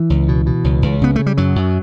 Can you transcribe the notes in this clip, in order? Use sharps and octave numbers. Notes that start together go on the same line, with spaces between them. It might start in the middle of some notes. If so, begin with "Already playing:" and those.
Already playing: E3
C#2
B2
B2
C#2
C#2
C#3 B3
C#3 A3
G3
F#2 F#3
F#2